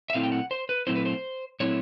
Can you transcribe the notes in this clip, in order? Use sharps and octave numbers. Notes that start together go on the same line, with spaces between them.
E5
A#2 F#3 A3 C4 E4 F5
G5
F#5
C5
B4
A#2 F#3 A3 C4 E4 C5
B4
C5
A#2 F#3 A3 C4 E4 C#5